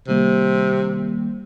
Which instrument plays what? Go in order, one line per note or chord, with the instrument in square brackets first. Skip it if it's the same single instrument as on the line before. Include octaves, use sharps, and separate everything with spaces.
[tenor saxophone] C3 [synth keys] D#3 G3 A#3